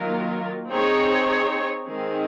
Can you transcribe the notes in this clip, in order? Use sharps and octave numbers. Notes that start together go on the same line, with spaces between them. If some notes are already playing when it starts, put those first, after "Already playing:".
Already playing: D#3 F#3 A#3 F4 A#4
C4 D#4 G#4 C#5
D#3 G#3 C4 D#4 G#4